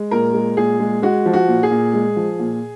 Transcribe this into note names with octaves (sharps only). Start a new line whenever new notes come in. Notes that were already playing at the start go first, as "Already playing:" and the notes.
Already playing: G#3
A#2 A#4
G#3
A#2 G#4
G#3
G#3 F#4
F3
F#4
A#2
G#4
A#2
G#3
F3
A#2